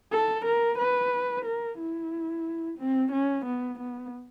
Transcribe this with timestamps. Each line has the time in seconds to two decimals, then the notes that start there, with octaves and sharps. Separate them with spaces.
0.12 A4
0.45 A#4
0.78 B4
1.45 A#4
1.79 E4
2.78 C4
3.12 C#4
3.45 B3
3.79 B3